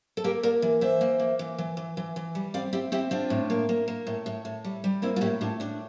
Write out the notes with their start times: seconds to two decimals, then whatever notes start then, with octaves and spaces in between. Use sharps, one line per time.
0.17 A4
0.24 A#3 G4 A#4
0.43 A#3 A#4 D5
0.62 E3
0.81 E3 C5 E5
1.01 A#3
1.20 A#3
1.39 E3
1.58 E3
1.77 E3
1.97 E3
2.16 E3
2.35 G3
2.54 C4 D5 F5
2.73 C4 E4 G4
2.92 C4 E4 G4
3.11 C4 D4 F4
3.30 A2
3.50 A#3
3.69 A#3
3.88 A#3
4.07 A2
4.26 A2
4.45 A2
4.65 G3
4.84 G3
5.02 A#3 C4 E4
5.16 F4
5.21 A2 E4 G4
5.41 A2 D4 F4
5.60 A2 D4